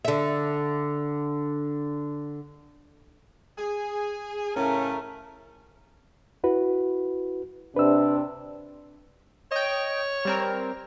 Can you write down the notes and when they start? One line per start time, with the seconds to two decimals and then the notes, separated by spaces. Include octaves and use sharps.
0.05 D3 E5
3.58 G#4
4.56 A2 C#3 A3 C#4 A#4
6.44 E4 F#4 B4
7.76 C3 D4 B4 E6
9.52 C#5 D#5 G5
10.25 G3 C4 A#4